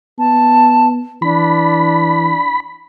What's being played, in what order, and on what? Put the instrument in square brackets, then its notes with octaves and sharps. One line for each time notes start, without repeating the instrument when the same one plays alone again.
[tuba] B3 [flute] A5
[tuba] E3 [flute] D4 [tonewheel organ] B5